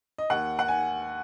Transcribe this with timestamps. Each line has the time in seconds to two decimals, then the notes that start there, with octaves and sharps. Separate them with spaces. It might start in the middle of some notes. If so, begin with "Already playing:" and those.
0.18 D#5
0.30 D#2 F#5
0.59 F#5
0.68 G#5